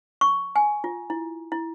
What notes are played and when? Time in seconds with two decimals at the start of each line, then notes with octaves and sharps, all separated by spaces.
0.21 C#6
0.56 G#5
0.84 F4
1.10 E4
1.52 E4